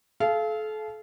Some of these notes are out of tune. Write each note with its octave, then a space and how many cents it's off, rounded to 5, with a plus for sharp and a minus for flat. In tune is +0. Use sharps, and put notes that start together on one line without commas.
A4 -35 F5 -25